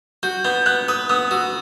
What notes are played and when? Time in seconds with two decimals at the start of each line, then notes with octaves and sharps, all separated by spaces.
0.23 F#4 G6
0.45 B3 G6
0.66 B3 F#6
0.88 B4 D#6
1.10 B3 D#6
1.31 F#4 E6